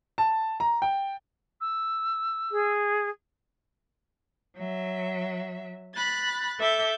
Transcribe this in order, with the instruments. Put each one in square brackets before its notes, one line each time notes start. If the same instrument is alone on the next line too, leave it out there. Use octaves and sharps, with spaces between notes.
[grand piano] A5
A#5
G5
[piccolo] E6
[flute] G#4
[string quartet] F#3 E5
B5 F#6 A6
A4 E5 D6 G6